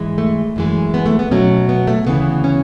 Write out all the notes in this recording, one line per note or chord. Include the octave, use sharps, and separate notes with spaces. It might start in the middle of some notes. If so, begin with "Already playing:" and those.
Already playing: G#2 E3 G#3
A3
F#2 E3 G#3
B3
A3
B3
B2 F#3 A3 C#4
B3
A3
D2 C#3 E3 B3
C#4